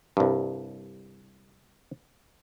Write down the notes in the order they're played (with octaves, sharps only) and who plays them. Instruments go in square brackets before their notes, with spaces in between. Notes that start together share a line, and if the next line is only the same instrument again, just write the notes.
[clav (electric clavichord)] C2 G2